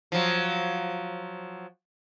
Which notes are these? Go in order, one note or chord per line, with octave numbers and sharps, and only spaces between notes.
F3 F#3